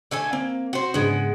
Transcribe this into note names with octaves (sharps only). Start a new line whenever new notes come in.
D3 A3 G#5
A#3 C4
F#4 C5
G#2 C#3 G#3 B3 D4